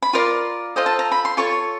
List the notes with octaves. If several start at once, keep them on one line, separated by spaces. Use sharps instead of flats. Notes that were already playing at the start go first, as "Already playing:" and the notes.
B5
F4 A#4 D5 C6
F4 A4 C5 D#5
A5
A#5
B5
C6
F4 A4 C#5 C#6